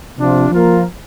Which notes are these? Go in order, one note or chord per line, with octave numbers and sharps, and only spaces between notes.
C3 F3 D4 F4
F3 A#3 F4 A#4